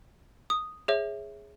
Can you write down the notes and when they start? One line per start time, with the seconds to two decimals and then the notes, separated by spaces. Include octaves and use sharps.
0.50 D#6
0.88 G#4 C#5 E5